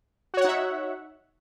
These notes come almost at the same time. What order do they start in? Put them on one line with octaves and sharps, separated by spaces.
F#4 C#5 F#5 D#4 E5